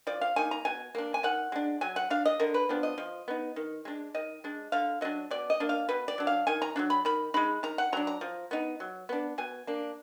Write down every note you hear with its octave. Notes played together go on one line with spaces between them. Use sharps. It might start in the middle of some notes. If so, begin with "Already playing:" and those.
F3 D5
F5
A#3 D#4 G#5
A#5
B2 G#5
A#3 D4
G#5
D#3 F#5
G#3 D4
F#3 G#5
F#5
D4 F5
D#5
D3 A#4
B4
F3 B3 D4
D#5
F3
B3 D#4
D#3
G#3 D4
D#3 D#5
G#3 D4
D3 F5
F#3 D4 D#5
B2 D5
D#5
A#3 D4
F5
B2 B4
D5
F#3 D4
F5
D#3 G#5
A#5
F#3 A#3 D4
B5
D#3 B5
G#3 D#4 B5
D#3 A#5
F#5
F#3 D4 A#5
A#5
F3
B3 D#4
F#3
B3 D4
B2 G#5
A#3 D4